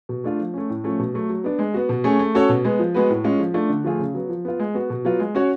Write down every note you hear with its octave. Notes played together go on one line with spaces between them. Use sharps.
B2
A3 D4 F4
F3
A3 C#4
A2
F3 A3 C#4
B2
F#3 A3
F#3
B3 D4
G#3
B3 F#4
B2
A3 C#4 G#4
A3
C#4 F#4 A4 C#5
B2
G#3 B3
F3
G#3 B3 F#4 B4
A2
G#3 C#4 F4
F3
A3 D4 F4
D3
F3 A3 F4 G#4
C#3
F#3 B3
F3
B3 F4
G#3
B3 F#4
B2
F#3 B3 F4
G#3
C#4 F#4 C#5